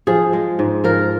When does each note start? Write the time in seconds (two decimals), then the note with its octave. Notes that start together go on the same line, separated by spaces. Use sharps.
0.07 F3 G#4
0.33 G#3
0.59 G#2
0.84 F3 A#4